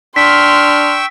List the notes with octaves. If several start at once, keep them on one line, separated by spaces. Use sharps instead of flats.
D4 G5 C6 C#6 E6 F6 B6